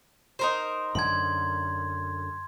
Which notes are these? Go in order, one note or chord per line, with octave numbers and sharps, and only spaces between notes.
D#4 A#4 C5
F#2 D3 C6 G#6